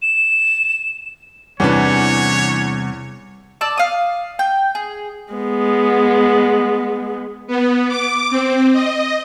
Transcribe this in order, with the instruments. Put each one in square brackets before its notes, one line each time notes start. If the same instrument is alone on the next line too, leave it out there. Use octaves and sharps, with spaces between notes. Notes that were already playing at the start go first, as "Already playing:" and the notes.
[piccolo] E7
[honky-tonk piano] E2 [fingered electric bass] C3 G3 [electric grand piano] C#4 D4 B4 [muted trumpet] C#5
[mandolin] D5 A5 E6
F5 D#6
G5
G#4
[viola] G#3 B3
[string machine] B3
D6
C4
D#5